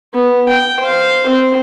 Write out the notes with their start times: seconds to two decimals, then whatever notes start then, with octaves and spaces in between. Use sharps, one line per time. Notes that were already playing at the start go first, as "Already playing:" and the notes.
0.14 B3
0.49 G5
0.80 C5 F5
1.27 C4 C5